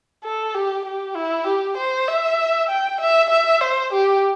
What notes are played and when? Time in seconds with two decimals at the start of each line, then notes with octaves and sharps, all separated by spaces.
0.24 A4
0.55 G4
0.85 G4
1.16 E4
1.47 G4
1.77 C5
2.08 E5
2.69 G5
3.01 E5
3.30 E5
3.61 C5
3.93 G4